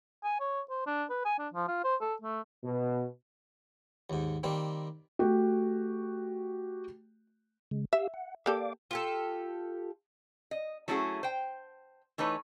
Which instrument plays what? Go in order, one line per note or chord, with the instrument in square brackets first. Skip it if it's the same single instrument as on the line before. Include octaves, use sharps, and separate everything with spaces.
[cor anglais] G#5
C#5
C5
D4
B4
G#5
D4
F3
F4
C5
A4
A3
[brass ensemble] B2
[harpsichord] D#2 G#2
D#3 G3 A#3 C4
[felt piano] A3 F#4 G4
[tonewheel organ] C#3 G#3
[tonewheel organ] G4 F5 E6 [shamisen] E5
[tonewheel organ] F#5
[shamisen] A#3 G4 A4 [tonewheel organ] D5 F5 D6
[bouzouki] F4 G4 A4
[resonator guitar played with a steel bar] D#5
F#3 A3 C#4 E4 F#4 G#4
C5 G5
E3 A3 D#4 B4 C#5